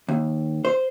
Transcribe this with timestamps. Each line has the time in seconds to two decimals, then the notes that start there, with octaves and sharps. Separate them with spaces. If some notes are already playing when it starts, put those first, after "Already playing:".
0.08 D#2
0.65 C5